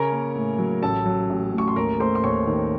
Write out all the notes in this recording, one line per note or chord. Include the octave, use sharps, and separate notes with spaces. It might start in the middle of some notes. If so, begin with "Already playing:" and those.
Already playing: C#3 C#4 A#4 A#5
A#3
A2
F#3
A1 A4 A5
F#3
A1
A2
C#6
C6
D#2 A#4 A#5
A3 C5 C6
C6
D#2 C#5 C#6
D#3